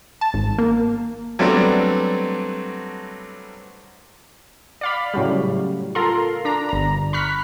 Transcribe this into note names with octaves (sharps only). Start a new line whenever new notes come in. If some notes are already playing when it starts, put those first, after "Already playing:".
A5
G#1
A#3
F#3 G3 A3 B3 C4 D4
D5 F5 B5
A2 C#3 F#3 G3
F4 A4 A#4 A#5 C6
D4 A#5
G1 A#5
B5 C#6 F6 F#6 B6